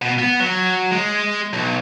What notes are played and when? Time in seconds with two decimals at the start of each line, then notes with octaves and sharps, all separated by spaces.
0.02 B2
0.18 B3
0.40 F#3
0.92 G#3
1.53 B1